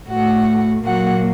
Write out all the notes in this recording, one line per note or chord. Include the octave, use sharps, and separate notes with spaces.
A2 A3 F#4 F#5
A#2 F#3 A#3 F#4 F#5